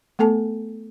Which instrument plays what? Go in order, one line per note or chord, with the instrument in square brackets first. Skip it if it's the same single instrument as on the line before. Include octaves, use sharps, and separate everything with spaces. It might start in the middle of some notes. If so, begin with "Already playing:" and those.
[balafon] A3 B3 A4 G#5 A5